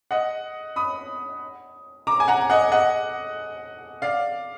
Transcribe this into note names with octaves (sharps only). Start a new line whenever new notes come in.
D#5 F#5
B5 D#6
A#5 D6
G#5
F#5 A#5
D#5 F#5
D#5 F#5
D5 F5